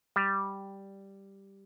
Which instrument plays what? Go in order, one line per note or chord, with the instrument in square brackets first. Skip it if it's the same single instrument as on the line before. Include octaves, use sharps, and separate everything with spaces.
[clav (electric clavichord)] G3